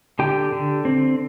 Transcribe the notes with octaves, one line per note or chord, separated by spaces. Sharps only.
D3 G4 G5
D3
C4